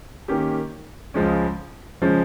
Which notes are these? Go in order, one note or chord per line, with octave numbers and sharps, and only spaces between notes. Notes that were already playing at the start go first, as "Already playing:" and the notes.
D#3 A#3 C#4 G4
C#2 C#3 F3 G#3 C#4
C#3 F3 G#3 C#4